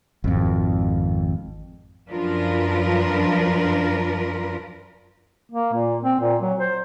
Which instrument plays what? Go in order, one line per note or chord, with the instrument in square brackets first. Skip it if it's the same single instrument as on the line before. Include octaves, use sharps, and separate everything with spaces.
[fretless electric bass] G#1 F2
[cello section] F#2 F3 D4 F4 A#4 B4
[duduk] A#3
A#2
C4
A#2
F#3
C5